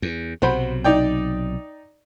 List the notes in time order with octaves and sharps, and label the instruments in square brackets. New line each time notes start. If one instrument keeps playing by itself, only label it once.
[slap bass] E2
[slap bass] B1 C3 F#3 [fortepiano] F#4 C5 B5
[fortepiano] D#4 D5 G5